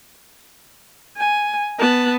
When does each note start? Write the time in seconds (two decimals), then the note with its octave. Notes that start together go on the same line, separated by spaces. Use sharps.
1.17 G#5
1.79 B3 A5